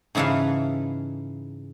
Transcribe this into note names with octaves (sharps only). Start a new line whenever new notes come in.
G#2 C#3 E3 A4 B4 F5